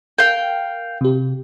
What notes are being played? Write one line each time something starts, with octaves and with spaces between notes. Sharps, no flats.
A#4 F5 G5
C3 G4